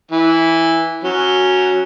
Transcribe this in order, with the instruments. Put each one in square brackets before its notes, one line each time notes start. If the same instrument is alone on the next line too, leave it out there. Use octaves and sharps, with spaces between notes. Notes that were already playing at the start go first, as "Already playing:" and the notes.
[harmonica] E3
F#3 C#4